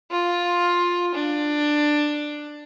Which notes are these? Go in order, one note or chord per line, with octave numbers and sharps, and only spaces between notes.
F4
D4